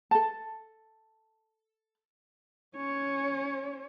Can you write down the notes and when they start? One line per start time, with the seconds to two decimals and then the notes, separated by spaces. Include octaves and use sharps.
0.11 A4 A5
2.76 C#4 C#5